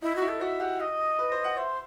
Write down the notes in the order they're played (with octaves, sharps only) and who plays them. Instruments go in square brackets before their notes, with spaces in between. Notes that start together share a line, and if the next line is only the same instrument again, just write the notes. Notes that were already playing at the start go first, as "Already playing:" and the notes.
[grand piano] D#4 [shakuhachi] E4
[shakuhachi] F#4
[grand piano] E4
[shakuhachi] A4
[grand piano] F#4 [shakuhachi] E5
[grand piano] G4 [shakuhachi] F#5
[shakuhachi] D#5
[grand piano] B4
C5
F#5
[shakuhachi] C5 [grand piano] E5